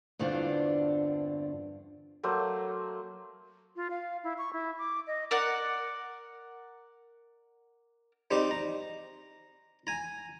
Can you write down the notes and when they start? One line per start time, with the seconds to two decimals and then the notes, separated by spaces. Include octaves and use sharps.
0.19 E2 G2 D3 C4 D4 F4
2.23 F#3 A3 A#3 C5
3.76 F4
3.90 F5
4.24 E4
4.38 C#6
4.53 E4
4.78 D6
5.07 D#5
5.31 A#4 D5 F#5
8.31 G3 C4 D#4 G4
8.51 A#5
9.87 G#5 A#5